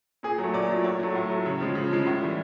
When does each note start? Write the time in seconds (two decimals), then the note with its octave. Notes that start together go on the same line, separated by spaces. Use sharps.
0.23 A#2 G#4
0.38 F#3
0.44 A3
0.53 A#2 D5
0.69 F#3 A3
0.84 A2 C#5
0.99 F#3 A3
1.15 A2
1.30 F#3 A3
1.45 C#3 C#5
1.60 F3 G#3
1.75 C#3
1.91 F3 G#3
2.07 A2
2.21 E3 G3